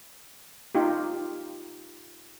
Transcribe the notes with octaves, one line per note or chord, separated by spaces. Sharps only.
D#4 F4 G4